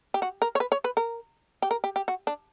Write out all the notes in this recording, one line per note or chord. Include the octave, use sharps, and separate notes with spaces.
G4
F#4
A#4
C#5
B4
C#5
B4
A#4
G4
A#4
G4
G4
F#4
D4